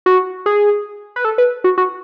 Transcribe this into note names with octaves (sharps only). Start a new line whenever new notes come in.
F#4
G#4
B4
A4
B4
F#4
F#4